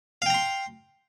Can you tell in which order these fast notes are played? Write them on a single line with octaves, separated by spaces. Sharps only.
F5 G5 A#5 C6